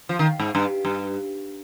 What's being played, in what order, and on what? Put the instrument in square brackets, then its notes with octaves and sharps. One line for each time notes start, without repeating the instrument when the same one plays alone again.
[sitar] F3
D#3
G#2
G2
G2